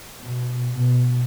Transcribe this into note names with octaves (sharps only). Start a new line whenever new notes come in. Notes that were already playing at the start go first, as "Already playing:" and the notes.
B2
B2